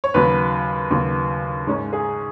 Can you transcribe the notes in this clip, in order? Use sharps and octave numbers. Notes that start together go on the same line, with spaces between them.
C#5
D#2 C#3 F#3 B4
D#2 C#3 F#3
G#2 G#3 C#4
G#4